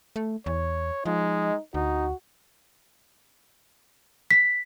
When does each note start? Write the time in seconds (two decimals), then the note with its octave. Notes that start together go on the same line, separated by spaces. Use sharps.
0.16 A3
0.46 E2 C#5
1.06 F3 G#3 D#4
1.74 D2 D#4 F#4
4.31 B6